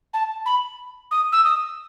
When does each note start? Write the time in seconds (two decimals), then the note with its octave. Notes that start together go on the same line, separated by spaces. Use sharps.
0.14 A5
0.46 B5
1.11 D#6
1.32 E6
1.44 D#6